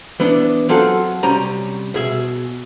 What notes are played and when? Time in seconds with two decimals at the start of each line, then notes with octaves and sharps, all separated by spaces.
0.20 E3 B3 D4
0.69 F#3 C4 F4 G#4 A4 F#5
1.23 C3 G3 C#4 A#5
1.94 B2 G#4 E5